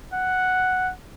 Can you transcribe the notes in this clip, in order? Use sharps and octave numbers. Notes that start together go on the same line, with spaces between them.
F#5